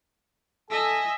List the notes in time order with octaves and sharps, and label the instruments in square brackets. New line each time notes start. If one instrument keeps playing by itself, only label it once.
[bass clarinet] A4 [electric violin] D#5 E5 [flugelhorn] G#5